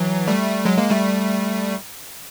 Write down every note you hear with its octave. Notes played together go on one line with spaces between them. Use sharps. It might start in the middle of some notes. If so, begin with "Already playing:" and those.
Already playing: E3 F#3
G3 A3
F#3 G#3
G#3 A#3
G3 A3